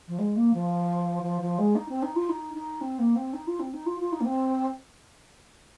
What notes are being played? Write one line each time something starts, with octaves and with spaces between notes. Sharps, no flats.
F3
G#3
A#3
F3
F3
F3
G#3
D#4
C4
D#4
F4
D#4
D#4
C4
A#3
C4
D#4
F4
C4
D#4
F4
F4
D#4
A#3
C4